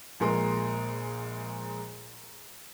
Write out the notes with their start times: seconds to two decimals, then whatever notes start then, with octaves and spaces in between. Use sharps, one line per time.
0.20 A#1 A#2 G#3 A#4 A#5 C6